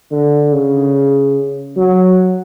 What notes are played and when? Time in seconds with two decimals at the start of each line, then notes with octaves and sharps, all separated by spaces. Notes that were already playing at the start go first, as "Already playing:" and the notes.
0.11 D3
0.53 C#3
1.77 F#3